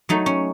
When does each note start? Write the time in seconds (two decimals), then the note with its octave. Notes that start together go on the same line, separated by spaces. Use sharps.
0.09 F#3 A3 D#4
0.26 C#4